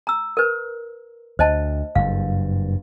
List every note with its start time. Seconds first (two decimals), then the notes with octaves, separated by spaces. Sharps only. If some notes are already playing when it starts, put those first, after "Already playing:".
0.07 A#5 E6
0.37 A#4 B4
1.39 D2 C5 D#5 A5
1.95 F#1 G2 F5